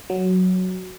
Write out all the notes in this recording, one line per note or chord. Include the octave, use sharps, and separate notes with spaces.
F#3